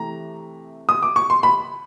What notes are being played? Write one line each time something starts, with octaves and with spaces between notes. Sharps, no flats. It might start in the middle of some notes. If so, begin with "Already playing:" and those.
Already playing: C3 E3 A3 A#5
D#6
D6
C#6
C6
B5